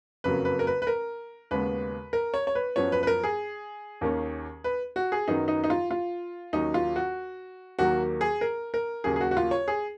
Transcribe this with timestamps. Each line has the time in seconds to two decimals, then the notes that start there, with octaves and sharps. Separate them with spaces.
0.24 F#1 F2 C#3 F#3 A#3 B4
0.45 B4
0.59 A#4
0.67 B4
0.82 B4
0.87 A#4
1.51 D#2 C#3 G#3 B3 B4
2.13 A#4
2.34 C#5
2.47 C#5
2.55 B4
2.76 F#2 F3 B3 C#5
2.92 B4
3.03 B4
3.07 A#4
3.24 G#4
4.01 D#2 D#3 A#3 C#4
4.64 B4
4.96 F#4
5.12 G#4
5.28 F#2 D#3 F#3 B3 D#4
5.48 D#4
5.64 D#4
5.70 F4
5.91 F4
6.53 D#2 D#3 F#3 C#4 D#4
6.74 F4
6.96 F#4
7.79 D#2 D#3 F#3 A#3 F#4
8.21 G#4
8.41 A#4
8.74 A#4
9.04 D#2 C#3 F#3 A#3 G#4
9.16 G#4
9.21 F#4
9.31 F#4
9.37 F4
9.51 C#5
9.68 G#4